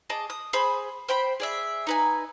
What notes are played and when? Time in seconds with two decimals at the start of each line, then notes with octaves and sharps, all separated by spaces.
0.10 G#4 D#5 A5 D6
0.30 D#6
0.53 G#4 C5 B5
1.09 C5 G5 B5
1.40 G#4 D5 E5
1.87 D#4 B4 G#5